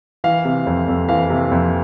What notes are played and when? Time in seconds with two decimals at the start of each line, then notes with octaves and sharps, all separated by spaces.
0.24 E3 F5
0.45 C3
0.66 F2
0.88 F2
1.09 E3 F5
1.30 C3
1.51 F2